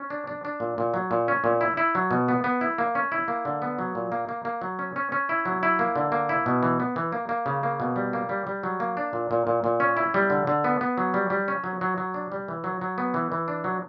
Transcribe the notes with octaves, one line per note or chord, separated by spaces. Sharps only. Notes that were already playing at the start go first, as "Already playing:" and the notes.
Already playing: C#4
D4
D4
D4
A#2
A#2
F#3
A#2
C#4
A#2
E4
E4
F#3
B2
B3
B3
E4
A#3
C#4
E4
A#3
D3
B3
F#3
A#2
A#3
A#3
A#3
F#3
C#4
C#4
C#4
E4
F#3
E4
A#3
D3
A#3
E4
B2
E3
B3
E3
A#3
A#3
C#3
A#3
B2
G3
A#3
G3
G3
F#3
A#3
D4
A#2
A#2
A#2
A#2
C#4
E4
G3
D3
D3
B3
B3
F#3
G3
G3
C#4
F#3
F#3
F#3
D4
G3
E3
F#3
F#3
B3
E3
E3
D4
F#3